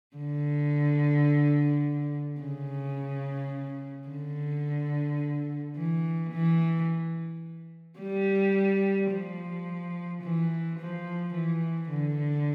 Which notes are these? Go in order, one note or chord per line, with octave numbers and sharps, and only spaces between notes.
D3
C#3
D3
E3
E3
G3
F3
E3
F3
E3
D3